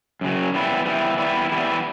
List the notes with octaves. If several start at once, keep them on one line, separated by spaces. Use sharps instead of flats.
F#2 C#3 F#3
E3 G3 B3 E4
E3 G3 B3 E4
E3 G3 B3 E4
E3 G3 B3 E4